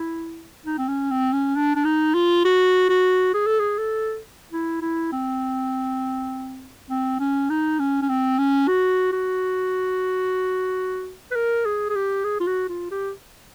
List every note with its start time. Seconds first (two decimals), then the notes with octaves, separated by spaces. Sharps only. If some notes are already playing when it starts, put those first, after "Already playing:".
Already playing: E4
0.66 D#4
0.78 C4
0.88 C#4
1.11 C4
1.33 C#4
1.56 D4
1.76 D4
1.85 D#4
2.15 F4
2.45 F#4
2.89 F#4
3.34 G#4
3.47 A4
3.60 G#4
3.78 A4
4.52 E4
4.82 E4
5.12 C4
6.90 C4
7.20 C#4
7.50 D#4
7.79 C#4
8.02 C#4
8.09 C4
8.38 C#4
8.68 F#4
9.13 F#4
11.31 B4
11.36 A#4
11.65 G#4
11.89 G#4
11.95 G4
12.24 G#4
12.40 F4
12.47 F#4
12.69 F4
12.91 G4